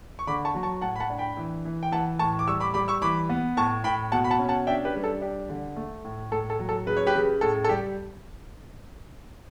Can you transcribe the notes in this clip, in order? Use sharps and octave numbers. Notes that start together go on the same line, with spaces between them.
C#6
D3 B5 D6
A5 C#6
F#3
A5 C#6
A2 F#5 A5
B5
F#5 A5
D4
G5 B5
E3
E3
G5
E3 F#5 A5
A2 A5 C#6
D6
G3 C#6 E6
B5 D6
G3 B5 D6
C#6 E6
E3 B5 D6
B3
A2 A5 C#6
A2 G5 B5
B2 F#5 A5
B5
F#5 A5
C#4
F#5 A5
D4 E5 G5
G4 B4
G3
A4
D4 G4
D3
A3
A2
A2 A4
A4
F#3
A4
C#3 B4
C#5
G4 B4
C#3
A2 A4
A4
G3 G4